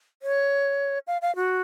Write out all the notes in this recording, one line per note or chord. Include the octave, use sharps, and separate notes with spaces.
C#5
F5
F5
F#4